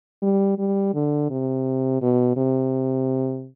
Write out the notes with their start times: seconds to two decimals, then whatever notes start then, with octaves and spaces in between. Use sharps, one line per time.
0.22 G3
0.58 G3
0.94 D3
1.30 C3
2.02 B2
2.37 C3